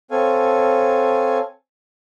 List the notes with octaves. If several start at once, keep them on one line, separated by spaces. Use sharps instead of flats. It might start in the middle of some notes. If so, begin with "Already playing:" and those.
C4 A4 C#5 F5 G#5